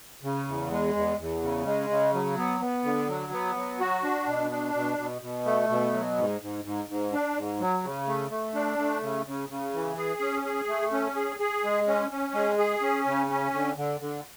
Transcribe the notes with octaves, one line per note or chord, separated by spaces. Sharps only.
C#3
E2
G#3
E2
E2
C#3
G#3
C#3
F#3
B3
B3
D3
F#3
B3
F#3
F#4
D4
B2
D4
B2
B2
B2
A3
B2
F#3
G#2
G#2
G#2
G#2
D4
G#2
F#3
C#3
A3
A3
D4
A3
C#3
C#3
C#3
E3
G#4
C#4
G#4
A3
C#4
G#4
G#4
G#3
C#4
C#4
G#3
G#4
C#4
C#3
C#4
D3
D3
D3